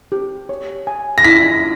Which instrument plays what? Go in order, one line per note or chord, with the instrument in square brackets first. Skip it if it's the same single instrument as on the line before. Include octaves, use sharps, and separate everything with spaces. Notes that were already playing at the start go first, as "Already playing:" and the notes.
[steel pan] G4
C#5
G#5
[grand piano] A#6
[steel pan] E4 [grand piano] B6